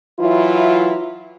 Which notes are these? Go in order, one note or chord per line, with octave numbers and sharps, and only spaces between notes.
E3 F#3 E4 F4